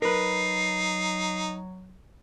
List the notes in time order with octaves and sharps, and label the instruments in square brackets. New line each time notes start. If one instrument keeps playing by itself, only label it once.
[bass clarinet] F#3 [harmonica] D#4 [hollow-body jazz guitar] A#4 B4 [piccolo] C7